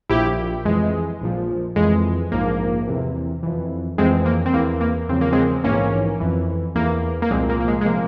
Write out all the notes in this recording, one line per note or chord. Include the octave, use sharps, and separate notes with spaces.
A#1 A#2 F3 E4 G4
F2 E3 G#3
A#1 A#2 F3
F2 E3 G#3
A#1 G#2 F3 A#3
E2 C3 E3
F2 E3
F2 E3 G#3 C4
A#3
C4
E2 E3 A#3
A#3
E2 C#3 F3 C4
A#3
G#3 C4
A#1 G#2 E3 A#3 C#4
F2 E3
E2 E3 A#3
A#3
C2 A#2 F3 G#3 C4
A#3
A#3
G#3
G#3
C3 F3 A#3